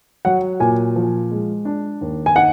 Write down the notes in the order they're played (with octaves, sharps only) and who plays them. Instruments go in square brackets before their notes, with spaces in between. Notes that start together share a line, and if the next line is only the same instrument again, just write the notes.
[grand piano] F#3 [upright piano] F#5
[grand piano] A#2 [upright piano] G#5
[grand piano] F3
G#3
D4
D#2
[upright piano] G#5
[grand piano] D#4 [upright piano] F#5